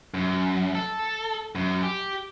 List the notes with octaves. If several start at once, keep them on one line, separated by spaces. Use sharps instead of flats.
F#2
A4
F#2
G4